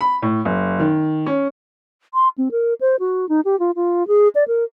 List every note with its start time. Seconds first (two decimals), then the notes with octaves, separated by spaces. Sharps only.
0.01 B5
0.22 A2
0.45 F#1
0.80 D#3
1.26 C#4
2.14 C6
2.38 C4
2.51 A#4
2.81 C5
3.00 F#4
3.29 D#4
3.45 G4
3.60 F4
3.76 F4
4.07 G#4
4.35 D5
4.48 A#4